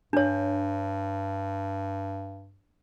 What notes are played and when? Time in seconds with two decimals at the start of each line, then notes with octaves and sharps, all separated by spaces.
0.13 G2 D4 C#5